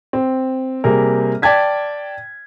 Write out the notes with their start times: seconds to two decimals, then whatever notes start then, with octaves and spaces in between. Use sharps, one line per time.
0.13 C4
0.84 C3 G3 A#3 G#4 A#4
1.42 D5 G5 A5 G#6 B6